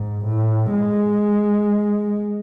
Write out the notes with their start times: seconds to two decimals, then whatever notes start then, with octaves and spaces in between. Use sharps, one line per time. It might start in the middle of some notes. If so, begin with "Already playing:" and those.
Already playing: G#2
0.25 A2
0.73 G#3